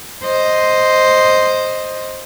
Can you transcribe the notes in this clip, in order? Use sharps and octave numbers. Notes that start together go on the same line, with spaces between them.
C5 D#5